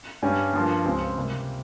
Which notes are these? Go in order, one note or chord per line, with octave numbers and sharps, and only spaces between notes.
G2 G3 C#4 G4
G2 F3 A#3
C#2 C#3 G#3 C4 G4
C3 G3 A#3